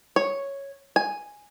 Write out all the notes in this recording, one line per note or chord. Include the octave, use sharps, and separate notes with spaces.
C#5
G#5